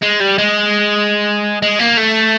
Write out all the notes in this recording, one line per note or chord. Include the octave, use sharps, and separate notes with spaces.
G#3
G3
G#3
G#3
A#3
A3